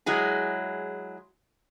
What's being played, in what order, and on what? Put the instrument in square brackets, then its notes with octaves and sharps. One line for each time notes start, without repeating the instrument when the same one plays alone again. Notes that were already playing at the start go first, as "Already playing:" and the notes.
[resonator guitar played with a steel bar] F#3 G#3 E4 G#4